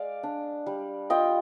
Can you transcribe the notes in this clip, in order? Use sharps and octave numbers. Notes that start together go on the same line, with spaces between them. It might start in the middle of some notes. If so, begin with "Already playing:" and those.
Already playing: G#3 D5 F5
D4
G3
F4 D#5 G5